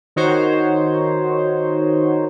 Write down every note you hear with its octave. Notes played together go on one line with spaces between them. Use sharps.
D#3 D#4 F#4 C5 C#5